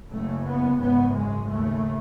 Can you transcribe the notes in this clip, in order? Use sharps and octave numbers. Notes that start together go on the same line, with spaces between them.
F#1 F#2 C#3 A3
B3
G#1 F#2 C#3 B3
G#3
D#2 C#3 A3